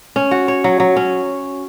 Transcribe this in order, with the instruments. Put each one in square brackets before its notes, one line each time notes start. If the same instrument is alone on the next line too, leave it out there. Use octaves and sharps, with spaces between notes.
[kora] C#4
F#4
C#5
F#3
F#3
C#4